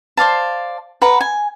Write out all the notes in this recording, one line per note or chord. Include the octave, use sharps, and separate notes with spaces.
C5 D5 F5 A5
B4 F#5 A#5
G#5